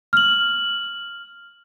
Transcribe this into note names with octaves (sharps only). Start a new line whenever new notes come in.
F6 F#7